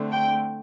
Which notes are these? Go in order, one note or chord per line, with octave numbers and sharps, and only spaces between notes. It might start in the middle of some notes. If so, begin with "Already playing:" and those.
Already playing: D3 A3 C4
G5